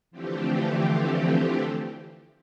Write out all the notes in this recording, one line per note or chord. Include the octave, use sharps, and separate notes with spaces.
D3 E3 F3 A3 C4 G4